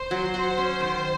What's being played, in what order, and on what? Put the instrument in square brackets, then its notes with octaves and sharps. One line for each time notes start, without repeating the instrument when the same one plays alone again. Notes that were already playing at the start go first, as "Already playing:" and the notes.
Already playing: [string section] C5
[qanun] F#3
F#4
C#4
D#3